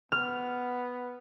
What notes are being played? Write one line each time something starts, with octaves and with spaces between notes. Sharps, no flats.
B3 F6